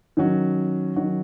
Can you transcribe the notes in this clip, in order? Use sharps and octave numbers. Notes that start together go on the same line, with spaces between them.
D#3 F#3 C#4 F#4
D#3 F#3 C#4 F#4